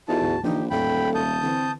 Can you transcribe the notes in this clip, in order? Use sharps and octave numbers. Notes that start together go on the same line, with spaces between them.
E2 D#4 F4 F#4 A4 A5
D2 G#2
A#1 D3 E3 F3 D#4 G4
D#1 E2 A2 A4 G5 B5
G#1 A5 D#6 G6
D3 E3 C4